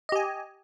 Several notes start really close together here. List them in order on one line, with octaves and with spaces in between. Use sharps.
D#5 G4 G#5